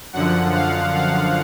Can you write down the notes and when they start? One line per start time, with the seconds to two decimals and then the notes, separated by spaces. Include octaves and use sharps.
0.13 F#2 D3 F3 F#5
0.54 F5
0.96 F5